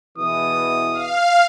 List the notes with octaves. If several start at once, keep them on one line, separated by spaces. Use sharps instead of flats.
E2 B2 E3 D#6
F5